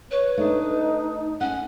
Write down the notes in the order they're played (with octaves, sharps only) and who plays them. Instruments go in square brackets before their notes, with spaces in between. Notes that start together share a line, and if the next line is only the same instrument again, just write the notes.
[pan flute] B4 [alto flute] C#5
[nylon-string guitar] A3 D4 [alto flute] D#4
[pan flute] C#4 [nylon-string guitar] F#5